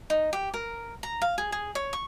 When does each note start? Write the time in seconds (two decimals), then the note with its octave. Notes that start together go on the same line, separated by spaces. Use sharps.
0.10 D#4
0.33 G4
0.54 A#4
1.03 A#5
1.22 F5
1.38 G#4
1.52 G#4
1.75 C#5
1.93 C#6